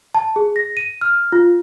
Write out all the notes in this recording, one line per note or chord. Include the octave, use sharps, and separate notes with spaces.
A5
G#4
A#6
D#7
F6
F4